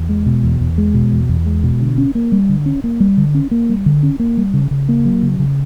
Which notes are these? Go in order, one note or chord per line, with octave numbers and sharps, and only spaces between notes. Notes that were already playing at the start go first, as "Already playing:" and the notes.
Already playing: E2
G#3
B2
E2
E2
G#3
B2
E2
E2
G#3
B2
D3
C#4
A#3
G3
D3
C#4
A#3
G3
D3
C#4
A#3
G3
D3
C#4
A#3
G3
C#3
C#3
A#3
F#3
C#3
C#3